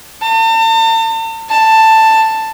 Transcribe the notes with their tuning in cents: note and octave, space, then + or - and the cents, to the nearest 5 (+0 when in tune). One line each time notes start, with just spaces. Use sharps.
A5 +40
A5 +10